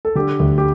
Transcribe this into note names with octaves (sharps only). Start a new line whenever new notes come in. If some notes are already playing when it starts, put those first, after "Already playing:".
A4
D3 G4
D2
G4